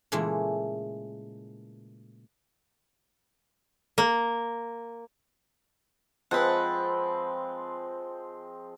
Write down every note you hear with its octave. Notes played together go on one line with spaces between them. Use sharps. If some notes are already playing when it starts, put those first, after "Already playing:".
A#2 C#3 E3 G#3 A3
A#3
F3 G#3 C4 B4 F#5